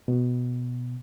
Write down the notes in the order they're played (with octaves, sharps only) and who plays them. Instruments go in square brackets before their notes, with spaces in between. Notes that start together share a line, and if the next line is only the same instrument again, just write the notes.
[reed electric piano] B2